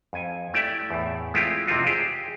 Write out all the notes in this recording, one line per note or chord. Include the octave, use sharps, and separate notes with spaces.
F2 G#5
A3 E4 G4 D5 E5 G5
E2 A2
G#3 A3 C4 E4 F4 G4
F2 C3 C4 D4 F4 F#4
G4 G#4 C5